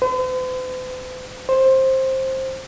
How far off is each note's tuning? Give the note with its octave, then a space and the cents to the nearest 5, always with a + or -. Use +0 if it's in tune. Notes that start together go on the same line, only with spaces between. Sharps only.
C5 -45
C5 +15